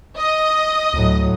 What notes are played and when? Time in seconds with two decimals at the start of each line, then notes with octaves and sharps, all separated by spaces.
0.19 D#5 D#6
0.93 D2 A2 F#3